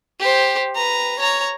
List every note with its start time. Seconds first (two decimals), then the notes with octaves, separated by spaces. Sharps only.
0.20 G4 C5
0.75 B4 A#5
1.19 C#5 A#5